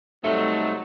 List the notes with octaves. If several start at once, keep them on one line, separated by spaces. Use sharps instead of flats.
C3 F#3 G3 A3 D#4 E5